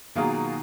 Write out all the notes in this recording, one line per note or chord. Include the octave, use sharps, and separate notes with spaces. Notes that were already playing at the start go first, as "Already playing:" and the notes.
B2 D#3 F#3 A#3 F4 G#4